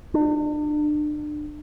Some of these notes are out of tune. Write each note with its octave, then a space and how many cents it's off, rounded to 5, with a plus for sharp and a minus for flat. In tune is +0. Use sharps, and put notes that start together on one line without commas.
D4 +35